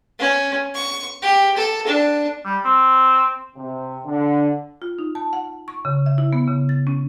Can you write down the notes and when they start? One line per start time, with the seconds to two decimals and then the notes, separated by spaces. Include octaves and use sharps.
0.19 C#4
0.74 C#6
1.22 G4
1.56 A4
1.87 D4
2.45 G3
2.65 C4
3.57 C3
4.05 D3
4.82 F4
4.99 D#4
5.15 A5
5.33 F#5
5.68 C#6
5.85 C#3
6.06 E5
6.18 E4
6.33 B3
6.48 C#3
6.69 A6
6.87 C#4